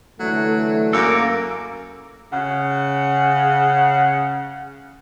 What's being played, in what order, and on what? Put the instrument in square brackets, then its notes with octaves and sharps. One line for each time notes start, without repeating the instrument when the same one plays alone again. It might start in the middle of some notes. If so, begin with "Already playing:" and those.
[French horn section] D3 E3 A3 [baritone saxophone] F#3
[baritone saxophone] F#2 [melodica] A#3 D6 [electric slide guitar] A4 A#4
[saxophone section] C#3 F#5